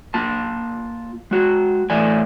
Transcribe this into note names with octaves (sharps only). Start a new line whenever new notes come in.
A#3 F4 A5
G#3 F#4
A2 E3 A3 D5 G#5